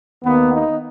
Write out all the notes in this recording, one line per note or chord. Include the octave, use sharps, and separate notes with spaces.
D#2 D#3 A#3 B3
D#4